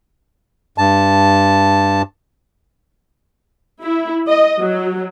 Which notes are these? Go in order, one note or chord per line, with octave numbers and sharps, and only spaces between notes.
G2 A5
E4
D#5
F#3